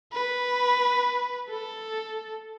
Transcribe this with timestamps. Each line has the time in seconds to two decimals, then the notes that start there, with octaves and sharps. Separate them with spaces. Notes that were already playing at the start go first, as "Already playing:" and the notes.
0.13 B4
1.49 A4